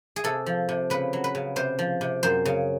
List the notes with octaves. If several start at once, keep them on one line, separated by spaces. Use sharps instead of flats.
G#4
C3 A4
F3
C3
C#3 B4
F#3
B4
C#3
C3 C5
F3
C3
F#2 C5
C#3